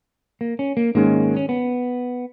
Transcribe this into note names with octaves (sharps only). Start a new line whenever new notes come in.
A#3
C#4
A#3
G#2 D#3 G#3 A#3 C#4
C#4
B3